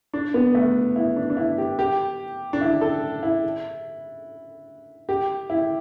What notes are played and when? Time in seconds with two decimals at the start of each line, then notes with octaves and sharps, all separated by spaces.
0.13 D4
0.34 B3
0.55 A3
0.96 E4
1.16 D4
1.30 D4
1.37 E4
1.58 G4
1.79 G4
2.53 D4
2.61 E4
2.81 A4
3.23 E4
5.09 G4
5.50 E4